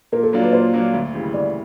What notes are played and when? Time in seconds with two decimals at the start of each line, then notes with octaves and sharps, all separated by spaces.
0.12 A#2 A#4
0.23 A4
0.33 F#3 A#3 D4 F4
0.43 B4
0.53 A#2 C5
0.73 F#3 A#3 D4 F4
0.93 D2
1.13 C#3 E3 G3
1.34 D2 D5